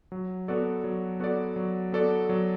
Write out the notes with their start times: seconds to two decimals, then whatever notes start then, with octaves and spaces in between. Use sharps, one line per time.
0.12 F#3
0.48 B3 F#4 A4 D5
0.84 F#3
1.20 B3 F#4 A4 D5
1.56 F#3
1.92 B3 F#4 A4 D5
2.29 F#3